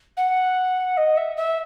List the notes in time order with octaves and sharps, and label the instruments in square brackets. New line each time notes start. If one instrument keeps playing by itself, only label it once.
[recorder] F#5
D#5
E5
E5